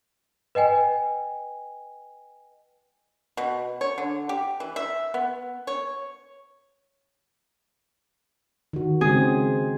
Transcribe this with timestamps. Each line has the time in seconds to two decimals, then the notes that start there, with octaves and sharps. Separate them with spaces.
0.55 B4 D#5 G5 G#5
3.37 B2
3.81 C#5
3.98 D3
4.29 G4
4.60 E3
4.76 E5
5.14 B3
5.67 C#5
8.73 D#3 F#4
9.01 C#3 G#3 C4 G#4